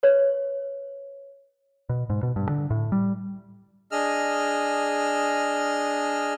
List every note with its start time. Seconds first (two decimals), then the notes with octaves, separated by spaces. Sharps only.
0.03 B4 C#5
1.89 B2
2.10 G#2
2.23 B2
2.36 G2
2.49 D3
2.70 A2
2.92 G3
3.91 D4 G#4 D#5 E6 F6